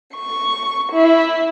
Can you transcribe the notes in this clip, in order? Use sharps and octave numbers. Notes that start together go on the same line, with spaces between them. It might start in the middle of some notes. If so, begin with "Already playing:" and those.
C#6
E4